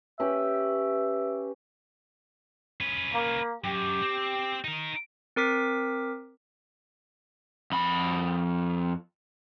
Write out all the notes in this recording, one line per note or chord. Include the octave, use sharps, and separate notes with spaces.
C#4 G4 B4 E5
C#4 B4
A#3
F#2 G4
C4
D#4 A#4
C4 A#4 D6 B6
F2 B5